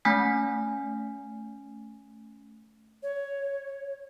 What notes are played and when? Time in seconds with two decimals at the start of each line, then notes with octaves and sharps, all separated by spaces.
0.05 A3 C#4 G#5 F6 G6 B6
3.03 C#5